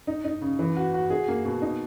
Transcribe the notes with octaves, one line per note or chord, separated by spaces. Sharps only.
D#4
D#4
C#3
E3
F#4
F#4
G#4
A#3
B2
D#4